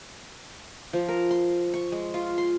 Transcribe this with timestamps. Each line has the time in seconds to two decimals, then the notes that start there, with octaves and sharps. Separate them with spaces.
0.93 F3
1.08 A#4
1.31 C6
1.74 C#6
1.92 G#3
2.14 F4
2.38 C6